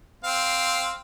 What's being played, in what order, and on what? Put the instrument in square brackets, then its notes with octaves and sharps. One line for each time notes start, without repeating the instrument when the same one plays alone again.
[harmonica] C4 F5